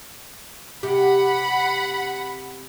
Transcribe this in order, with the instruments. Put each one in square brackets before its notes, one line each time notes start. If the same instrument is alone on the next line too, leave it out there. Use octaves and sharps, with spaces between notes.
[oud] C3 G4 [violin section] F#5 B5